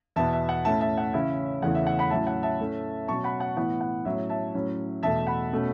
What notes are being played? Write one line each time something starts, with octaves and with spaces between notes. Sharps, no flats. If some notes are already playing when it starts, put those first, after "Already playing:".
E2 B2 B3 E5 A5
E5
F#5
A2 A3 C#4 E5 A5
E5 A5
F#5
C#3 E3 C#4 E4 E5
E2 C#3 E3 A3 F#5
E5
F#5
F#5 B5
A2 F#3 C#4 E4 E5 A5
F#5
E5 A5
A2 A3 C#4
B2 F#3 C#4 A5 C#6
F#5 B5
F#5
A2 E3 B3 E4 F#5
F#5
A2 F#3 C#4 E5
E5 A5
A2 F#3 C#4
E2 B2 A3 E5 A5
F#5 B5
B2 A3 C#4